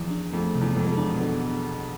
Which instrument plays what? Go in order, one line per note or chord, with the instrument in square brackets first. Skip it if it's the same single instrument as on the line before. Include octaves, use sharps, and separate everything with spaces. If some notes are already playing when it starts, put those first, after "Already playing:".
Already playing: [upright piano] E2 [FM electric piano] F3
[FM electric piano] D4
[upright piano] F2 [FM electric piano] A3
[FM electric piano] C3
[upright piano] E2
[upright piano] F2 [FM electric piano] G#3
[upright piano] F2
[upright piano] E2 [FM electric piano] D4
[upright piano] B2
[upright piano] D3 [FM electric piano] B3